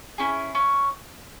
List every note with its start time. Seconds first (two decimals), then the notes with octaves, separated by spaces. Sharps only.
0.18 C#4 E4 G#4
0.55 C#4